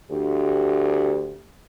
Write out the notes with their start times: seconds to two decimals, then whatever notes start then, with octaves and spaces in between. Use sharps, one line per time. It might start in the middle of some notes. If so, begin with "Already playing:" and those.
0.11 D2 G4